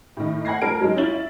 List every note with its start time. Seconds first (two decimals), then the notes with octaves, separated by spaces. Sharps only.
0.17 A2 D#3
0.45 F#5 G5 B5 G#6 A#6 C7
0.62 F3 A3 A#4 A5 G#6 D7
0.80 F#3 G#3 D#4
0.96 C#4 E4 F4 A6 F#7
1.13 E5